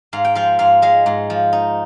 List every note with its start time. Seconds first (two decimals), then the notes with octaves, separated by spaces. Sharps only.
0.13 G#2 F5
0.25 G5
0.35 F3 F5
0.59 G#2 F5
0.82 G#3 F5
1.06 G#2
1.30 F3
1.53 D#4